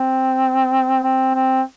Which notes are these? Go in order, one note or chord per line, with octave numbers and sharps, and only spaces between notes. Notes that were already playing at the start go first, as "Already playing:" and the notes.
Already playing: C4
C4
C4